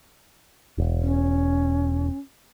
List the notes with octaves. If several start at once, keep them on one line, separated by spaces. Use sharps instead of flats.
E1
C#4